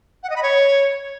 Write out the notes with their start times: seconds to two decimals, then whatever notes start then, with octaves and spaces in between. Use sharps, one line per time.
0.23 F#5
0.30 D#5
0.36 B5
0.43 C#5